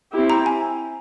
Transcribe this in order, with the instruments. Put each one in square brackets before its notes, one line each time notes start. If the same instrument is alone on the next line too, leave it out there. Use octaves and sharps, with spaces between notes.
[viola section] C4 E4 G4
[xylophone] A#5
G#5